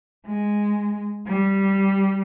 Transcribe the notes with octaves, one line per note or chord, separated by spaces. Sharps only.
G#3
G3